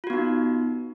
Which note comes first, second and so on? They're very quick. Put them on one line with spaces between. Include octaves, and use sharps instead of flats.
F4 F#4 B3 D#4